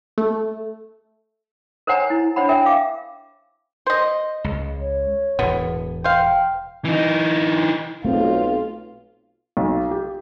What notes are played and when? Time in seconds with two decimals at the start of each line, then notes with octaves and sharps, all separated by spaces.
0.18 A3
1.87 A#4 C5 C#5 F#5 G#5 A#5
2.10 E4
2.36 D4 C5 C#5 F#5 B5
2.49 A#4 E5 G5 G#5
2.66 F5 D6
3.87 C5 D#5
4.44 C#2
4.81 C#5
5.39 E1 A2 B3
6.04 C5 F5 G5
6.85 E3 D#4
8.05 B1 A3 C4 F4
9.57 B1
9.91 G4